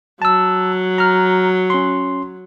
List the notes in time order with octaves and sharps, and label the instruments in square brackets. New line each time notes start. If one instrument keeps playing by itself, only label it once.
[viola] F#3 [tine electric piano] A5 E6
[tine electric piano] A#5 F6
C#4 C6